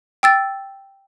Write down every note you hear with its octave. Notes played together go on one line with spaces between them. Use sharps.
G5 E6 A6